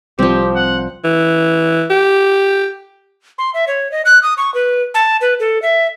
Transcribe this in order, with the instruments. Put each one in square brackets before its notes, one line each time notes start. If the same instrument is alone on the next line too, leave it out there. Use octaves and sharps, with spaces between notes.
[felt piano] C2 [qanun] F3 C4 [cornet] G4
[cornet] F#5
[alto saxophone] E3
G4
[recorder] C6
E5
C#5
D#5
F#6
D#6
C#6
B4
A5
B4
A4
E5